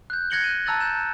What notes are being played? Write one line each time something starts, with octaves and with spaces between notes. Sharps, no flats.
F#6 G6
F#6 G#6 A#6 C#7 F#7 G7
D#7
A5 A#5 E6 F#6 A6 F#7
G6 E7